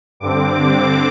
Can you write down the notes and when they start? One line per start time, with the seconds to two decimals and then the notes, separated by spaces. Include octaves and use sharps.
0.20 G2 D3 C4 D6